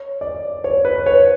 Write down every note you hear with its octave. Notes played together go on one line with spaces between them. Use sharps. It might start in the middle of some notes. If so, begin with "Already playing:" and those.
Already playing: C#5
D5
C#5
B4
C#5